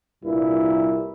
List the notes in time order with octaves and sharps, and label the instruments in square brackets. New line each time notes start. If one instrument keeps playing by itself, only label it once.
[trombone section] C2 G2 A#2 E4